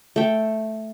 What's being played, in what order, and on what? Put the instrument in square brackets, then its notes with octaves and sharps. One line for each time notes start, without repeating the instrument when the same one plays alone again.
[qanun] A3 G5